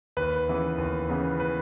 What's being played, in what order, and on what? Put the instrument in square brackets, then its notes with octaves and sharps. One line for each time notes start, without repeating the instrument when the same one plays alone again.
[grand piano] D#2 B4
C#3 E3 B3
D#2
C#3 E3 B3
B4